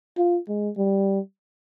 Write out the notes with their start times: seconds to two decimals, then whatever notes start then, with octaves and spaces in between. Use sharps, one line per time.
0.17 F4
0.48 G#3
0.77 G3